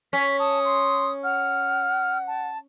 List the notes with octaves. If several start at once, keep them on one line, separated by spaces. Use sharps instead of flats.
C#4 B6
A5 D#6
C6
F#5 F6
A5